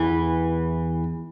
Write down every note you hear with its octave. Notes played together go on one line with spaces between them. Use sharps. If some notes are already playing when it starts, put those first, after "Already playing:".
Already playing: E2 E3